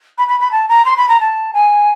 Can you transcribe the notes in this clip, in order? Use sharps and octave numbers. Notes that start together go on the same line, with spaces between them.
B5
B5
B5
A5
A#5
C6
B5
A#5
A5
G#5